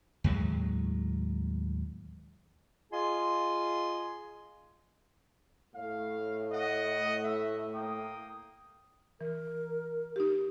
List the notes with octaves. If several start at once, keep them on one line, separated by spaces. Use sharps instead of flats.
D#2 A2 F#3 G#3
F4 G#4 D#5 G#5 C6
A2 A3 F5
D#5 F#5
E5
A#3 G5 D#6
E3 A#4
D#4 G4